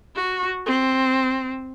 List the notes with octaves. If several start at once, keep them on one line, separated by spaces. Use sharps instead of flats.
F#4
C4